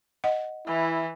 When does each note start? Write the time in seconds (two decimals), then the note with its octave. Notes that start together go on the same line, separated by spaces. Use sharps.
0.24 D#5 F#5
0.67 E3 E4